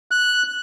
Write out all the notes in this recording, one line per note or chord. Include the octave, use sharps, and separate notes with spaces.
F#6